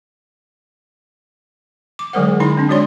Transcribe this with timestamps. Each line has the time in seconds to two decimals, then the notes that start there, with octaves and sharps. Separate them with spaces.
1.99 D6
2.13 D3 F#3 G#3 A#4 C5 F#5
2.29 D3
2.40 D3 D#4 E4 C6
2.57 C4 D4
2.69 G#3 F#4 C#5 D5 C6